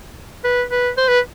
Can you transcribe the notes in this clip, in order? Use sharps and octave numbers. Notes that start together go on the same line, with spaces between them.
B4
B4
C5
B4